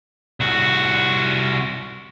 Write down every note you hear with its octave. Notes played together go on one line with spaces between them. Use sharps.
C2 F#4